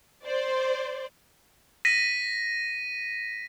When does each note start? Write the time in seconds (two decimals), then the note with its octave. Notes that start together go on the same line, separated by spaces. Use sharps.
0.25 C5 D5
1.85 A#6 B6 D#7